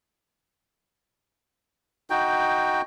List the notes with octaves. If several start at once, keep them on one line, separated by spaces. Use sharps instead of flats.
D#4 F#4 G5